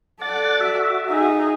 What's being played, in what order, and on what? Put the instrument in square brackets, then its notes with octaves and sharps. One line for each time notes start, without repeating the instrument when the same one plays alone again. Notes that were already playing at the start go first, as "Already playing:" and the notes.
[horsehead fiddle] A4 D5 [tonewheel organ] F#5 A6
[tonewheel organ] F#4 E5
[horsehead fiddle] D#4 G#4